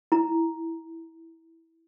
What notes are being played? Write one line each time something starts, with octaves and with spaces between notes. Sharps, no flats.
E4 A#5